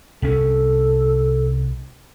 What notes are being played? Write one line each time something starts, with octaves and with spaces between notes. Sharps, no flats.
C2 C#4 A4